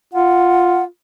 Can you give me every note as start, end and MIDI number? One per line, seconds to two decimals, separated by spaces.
0.13 0.86 65
0.13 0.83 78